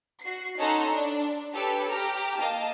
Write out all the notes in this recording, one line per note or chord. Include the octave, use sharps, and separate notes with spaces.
F#4 C7
C#4 D#4 A4 F#5 A#5 C6
D4
G4 A4 B4 C#5
G4 A#5 F6
A#3 D#5 F5 A5